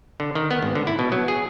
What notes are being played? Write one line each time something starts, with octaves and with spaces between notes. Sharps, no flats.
D3
D#3
B3
G#1
D3
E4
B2
F#3
G#4